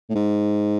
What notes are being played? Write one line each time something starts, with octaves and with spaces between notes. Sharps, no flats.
A2
G#2